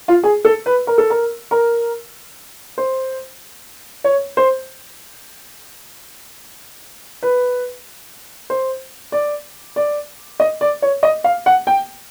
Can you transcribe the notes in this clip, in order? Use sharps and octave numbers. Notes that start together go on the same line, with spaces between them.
F4
G#4
A4
B4
A#4
A4
A#4
A#4
C5
C#5
C5
B4
C5
D5
D5
D#5
D5
C#5
D#5
F5
F#5
G5